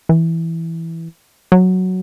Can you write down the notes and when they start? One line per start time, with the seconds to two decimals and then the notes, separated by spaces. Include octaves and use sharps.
0.09 E3
1.52 F#3